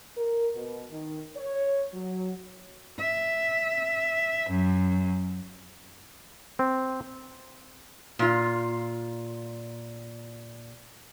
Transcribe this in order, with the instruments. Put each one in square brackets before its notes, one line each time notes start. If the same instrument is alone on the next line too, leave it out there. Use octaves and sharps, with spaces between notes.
[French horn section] A#4
B2
D#3
C#5
F#3
[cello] E5
F#2
[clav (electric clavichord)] C4
[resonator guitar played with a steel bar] A#2 F4